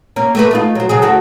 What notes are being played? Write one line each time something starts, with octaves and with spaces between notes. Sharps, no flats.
A#3 C#4
A3 A#3 B4
A3 D#4 F4
F#3 C5
C#3 F#3 G#4
D2 F#4 A4